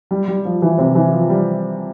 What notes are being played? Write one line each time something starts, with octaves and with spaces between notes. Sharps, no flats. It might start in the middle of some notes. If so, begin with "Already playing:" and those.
G3
G3
F3
E3
C3
E3
F3
G3